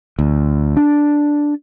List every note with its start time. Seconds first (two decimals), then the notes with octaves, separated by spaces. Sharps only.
0.19 D2
0.77 D4